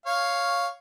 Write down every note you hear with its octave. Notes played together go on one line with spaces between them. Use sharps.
C#5 F5